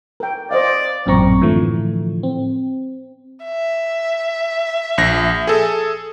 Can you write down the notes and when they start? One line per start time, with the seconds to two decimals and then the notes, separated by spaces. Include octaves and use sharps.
0.20 A#4 G5
0.51 C5 D5 D#5 F5
1.06 A1 F#2 A#2 C4 A#5 C#6
1.41 A2 D3 E3 F3 A3
2.23 C4
3.44 E5
4.98 A#1 A#6
5.47 G#4 A4